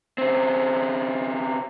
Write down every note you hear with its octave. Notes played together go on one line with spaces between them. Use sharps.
C#3 C4